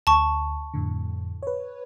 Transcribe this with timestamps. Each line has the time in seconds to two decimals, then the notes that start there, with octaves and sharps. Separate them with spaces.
0.07 D2 A5 C#6
0.74 F2 A2 D3
1.43 B4 C#5